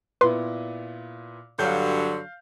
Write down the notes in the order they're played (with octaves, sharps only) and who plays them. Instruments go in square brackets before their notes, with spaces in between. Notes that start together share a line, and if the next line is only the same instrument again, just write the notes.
[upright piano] A#2 B3 E4 [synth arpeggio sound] B4 C6
[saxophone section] G2 D3 F#3 [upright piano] F5 G6